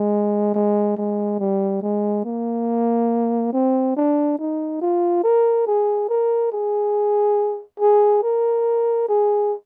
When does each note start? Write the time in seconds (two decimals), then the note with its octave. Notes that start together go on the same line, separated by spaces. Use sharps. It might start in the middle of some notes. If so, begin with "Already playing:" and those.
Already playing: G#3
0.54 G#3
0.97 G#3
1.39 G3
1.82 G#3
2.24 A#3
3.53 C4
3.96 D4
4.38 D#4
4.81 F4
5.23 A#4
5.66 G#4
6.09 A#4
6.52 G#4
7.80 G#4
8.23 A#4
9.09 G#4